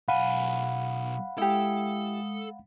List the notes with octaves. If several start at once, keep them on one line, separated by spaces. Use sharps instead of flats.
B1 F5 F#5 G#5 B5
G#3 E4 G4 A4 D#6